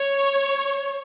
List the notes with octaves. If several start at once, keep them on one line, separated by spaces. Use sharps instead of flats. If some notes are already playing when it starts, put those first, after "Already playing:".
Already playing: C#5